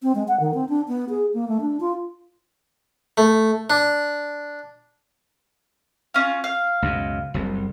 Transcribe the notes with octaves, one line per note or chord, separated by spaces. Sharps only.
C4
G#3
F#5
D#3
C4
D4
B3
G#4
A#3
A3
D4
F4
A3
D4
C#4 F4
F5
C#2 F#2 B2
F#1 C2